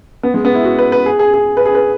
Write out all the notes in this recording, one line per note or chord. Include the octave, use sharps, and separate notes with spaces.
B3
G#3
B3
E4
F#4
B4
B4
G#4
G#4
G#4
B4
G#4
B4